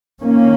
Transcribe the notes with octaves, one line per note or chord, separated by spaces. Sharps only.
D#3 A#3 C#4